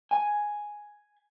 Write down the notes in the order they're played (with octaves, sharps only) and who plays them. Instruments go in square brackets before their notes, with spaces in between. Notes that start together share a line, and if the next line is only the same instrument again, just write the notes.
[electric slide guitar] G#5